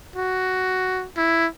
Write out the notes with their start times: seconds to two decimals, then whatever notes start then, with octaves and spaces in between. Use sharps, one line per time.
0.16 F#4
1.17 E4